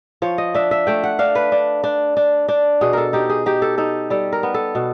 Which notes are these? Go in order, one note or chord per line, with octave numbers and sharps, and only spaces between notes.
F3 C#5
D#5
D4 E5
E5
A3 G5
F#5
D4 F5
B4
D4
D4
D4
D4
B2 G#4
A4 A#4
D#4 G4
G#4
D#4 G4
A4
D#4 A4
G3 A4
A#4
B3
A4
B2